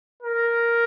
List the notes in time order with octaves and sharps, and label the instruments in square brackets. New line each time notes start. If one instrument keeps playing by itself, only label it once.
[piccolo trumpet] A#4